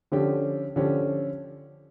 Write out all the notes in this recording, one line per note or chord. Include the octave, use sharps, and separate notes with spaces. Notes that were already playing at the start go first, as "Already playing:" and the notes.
D3 F3 C#4 G4
D3 F3 C#4 G4